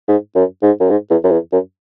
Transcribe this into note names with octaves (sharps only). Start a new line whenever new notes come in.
G#2
F#2
G#2
F#2
G#2
E2
F#2
E2
F#2